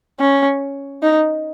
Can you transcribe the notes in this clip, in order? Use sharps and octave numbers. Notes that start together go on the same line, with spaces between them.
C#4
D#4